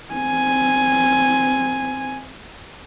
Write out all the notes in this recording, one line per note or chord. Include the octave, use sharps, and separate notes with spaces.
C4 G#5